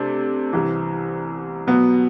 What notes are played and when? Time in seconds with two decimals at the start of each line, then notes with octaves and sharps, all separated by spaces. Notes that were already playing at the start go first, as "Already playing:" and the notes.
Already playing: C3 A3 D4
0.53 C2 C3 E3
1.67 B2 F#3 B3